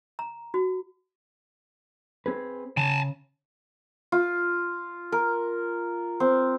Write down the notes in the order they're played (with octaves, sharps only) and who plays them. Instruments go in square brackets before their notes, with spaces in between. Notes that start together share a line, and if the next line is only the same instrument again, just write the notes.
[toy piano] A#5
F#4
[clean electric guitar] C4 G#4 B4
[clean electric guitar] C#3 [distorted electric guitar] G#5 A5
[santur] F4
A#4
C4